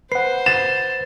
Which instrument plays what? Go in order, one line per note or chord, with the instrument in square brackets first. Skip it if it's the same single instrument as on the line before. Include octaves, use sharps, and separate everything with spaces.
[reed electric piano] B4 F#5 [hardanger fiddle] C5 [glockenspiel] C7
[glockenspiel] A6 [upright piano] E7